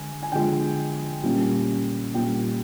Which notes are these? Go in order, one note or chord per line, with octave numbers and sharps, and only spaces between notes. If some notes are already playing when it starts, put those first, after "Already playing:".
Already playing: D3 G#3 G#5
G#5
D3 F3 G#3 G5
A#2 G3 A#3 C#4
A#2 G3 A#3 C#4 G5